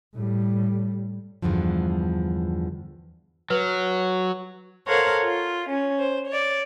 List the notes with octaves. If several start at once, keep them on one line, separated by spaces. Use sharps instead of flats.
A2 G3
E2 G2 D3 F3
F#3 B4
A4 A#4 C5 C#5 F5 F#5
F4
C#4
C5
C#5 D5